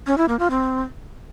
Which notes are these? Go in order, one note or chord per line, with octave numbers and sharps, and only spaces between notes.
C#4
E4
A#3
F4
C4